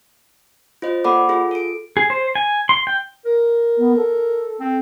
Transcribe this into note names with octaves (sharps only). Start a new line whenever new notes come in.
F4 C5 D#5
A#3 A4 D5 F#5 B5 D6
F4 G#4 A4
A4 D7
G#4
C5
G#5
C6
G5
A#4
B3
A4
C4